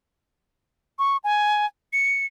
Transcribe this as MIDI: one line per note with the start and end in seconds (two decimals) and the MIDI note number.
0.99 1.17 85
1.24 1.66 80
1.93 2.26 97